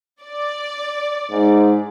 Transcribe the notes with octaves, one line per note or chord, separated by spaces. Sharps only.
D5
G#2